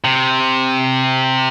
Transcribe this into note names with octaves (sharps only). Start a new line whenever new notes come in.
C3